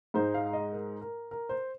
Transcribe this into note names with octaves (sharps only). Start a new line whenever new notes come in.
G#2 G#3 D#4 C5
F5
D#5
A#4
A#4
A#4
C5